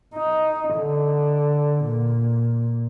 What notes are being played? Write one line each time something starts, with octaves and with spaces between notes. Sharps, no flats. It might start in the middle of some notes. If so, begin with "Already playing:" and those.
D#4
D3
A#2